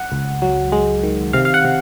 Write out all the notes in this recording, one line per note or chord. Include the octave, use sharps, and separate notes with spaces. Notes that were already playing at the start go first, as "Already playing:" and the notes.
Already playing: F#5
C#2
F#3
G#3
D#3
C3 F5
F5
F#5
C3